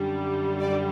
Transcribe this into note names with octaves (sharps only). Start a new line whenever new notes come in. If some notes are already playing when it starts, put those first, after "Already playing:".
Already playing: F#2 D3 G3
D5